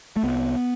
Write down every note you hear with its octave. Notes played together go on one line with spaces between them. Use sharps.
A3
C2 B3